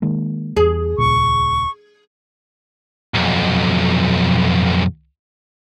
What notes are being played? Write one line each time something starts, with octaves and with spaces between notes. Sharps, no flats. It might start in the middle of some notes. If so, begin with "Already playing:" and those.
D#3 G#3 A#3
E2 G#4
D#1 C#2 A#2 C#6
B1 F2